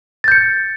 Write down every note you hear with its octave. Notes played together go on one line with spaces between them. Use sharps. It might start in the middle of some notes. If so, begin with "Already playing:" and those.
G6 A6 C#7